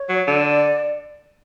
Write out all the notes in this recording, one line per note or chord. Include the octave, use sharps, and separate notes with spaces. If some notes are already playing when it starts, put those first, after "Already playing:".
Already playing: C#5
F#3
D3 D5